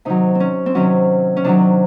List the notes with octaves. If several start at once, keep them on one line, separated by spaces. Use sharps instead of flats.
C3 D#3 F#3 D#4
C4
C#4
C4
C3 D#3 F#3 C#4
C#4
C3 D#3 F#3 D4